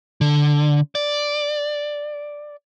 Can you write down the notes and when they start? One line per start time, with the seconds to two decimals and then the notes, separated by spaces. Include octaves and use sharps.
0.21 D3
0.95 D5